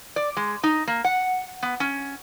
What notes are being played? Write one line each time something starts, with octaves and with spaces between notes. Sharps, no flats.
D5
G#3
D#4
A#3
F#5
B3
C#4